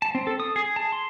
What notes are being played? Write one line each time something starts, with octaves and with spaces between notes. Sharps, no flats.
A5
C4
A4
D#6
G#4
A5
C6